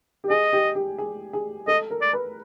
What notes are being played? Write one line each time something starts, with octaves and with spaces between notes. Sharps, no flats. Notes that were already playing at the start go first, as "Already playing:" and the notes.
G4
G#4 D#5
G4
G4
G#4
G#4
A4 D#5
A#4
D5
B4